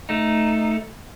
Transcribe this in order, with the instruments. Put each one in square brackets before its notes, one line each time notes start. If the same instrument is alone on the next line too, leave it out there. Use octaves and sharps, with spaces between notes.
[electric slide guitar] A3 D#4